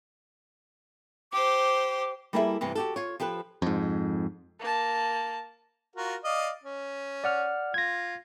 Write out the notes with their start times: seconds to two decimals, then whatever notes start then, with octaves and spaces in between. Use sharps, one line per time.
1.33 G4 C5 D6
2.33 G3 A#3 E4 G#4 A4 E5
2.61 G2 C3 E3
2.75 F#4 G4 A4
2.96 F4 C#5
3.20 F3 G4 A4 B4
3.62 F2 G#2
4.60 A#3 A5
5.96 F4 F#4 A#4
6.24 D5 D#5 F5
6.64 C#4
7.24 D5 F#5 F6
7.74 F4 G#6 A#6